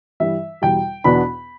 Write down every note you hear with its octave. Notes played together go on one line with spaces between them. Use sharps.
G2 E3 G3 E5
E2 B2 G3 G5
E2 B2 B3 D4 B5